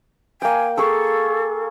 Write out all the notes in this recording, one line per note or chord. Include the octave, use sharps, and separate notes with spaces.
A#3 G5 G#5
G#4 A4 C#6 E6